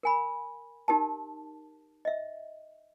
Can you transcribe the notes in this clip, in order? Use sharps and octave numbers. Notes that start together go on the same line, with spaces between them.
A#4 G#5 B5
D#4 G4 A#4 A5
D#5 E5